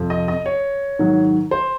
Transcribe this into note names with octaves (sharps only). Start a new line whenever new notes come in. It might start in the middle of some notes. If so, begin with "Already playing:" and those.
Already playing: F2 C3 F3
D#5
D#5
C#5
G#2 D#3 F#3
C5